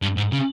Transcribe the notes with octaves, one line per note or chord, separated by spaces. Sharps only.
G2
G#2
C#3